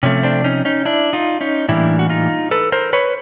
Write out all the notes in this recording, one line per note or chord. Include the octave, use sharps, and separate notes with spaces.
C3 F3 A3 C#4
C4 D4
C#4 D#4
C#4 D#4
D4 E4
D#4 F4
C#4 D#4
A2 E3 G3 A#3 D4 E4
F#4
D#4 F4
A4 B4
A#4 C5
B4 C#5